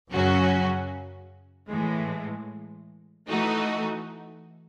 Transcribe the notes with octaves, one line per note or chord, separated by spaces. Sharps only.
F#2 C#3 F#3 C#4 F#4
A2 E3 G#3
E3 A3 D#4 F#4